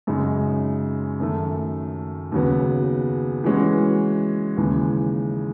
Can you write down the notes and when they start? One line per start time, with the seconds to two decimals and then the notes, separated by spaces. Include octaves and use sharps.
0.07 F#2 C#3 G#3 D#4
1.20 F#2 D#3 A3
2.32 D#2 C#3 F#3 B3
3.44 E3 G#3 C#4 F#4
4.57 D#2 C#3 E3 G#3